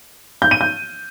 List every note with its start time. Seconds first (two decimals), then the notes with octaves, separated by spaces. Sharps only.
0.42 G6
0.51 D#7
0.61 G6